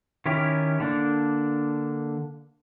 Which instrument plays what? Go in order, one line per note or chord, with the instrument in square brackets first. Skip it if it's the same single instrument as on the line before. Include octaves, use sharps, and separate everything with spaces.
[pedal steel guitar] D#3 C#4 E4 G4 A#4
D3 A#3 D4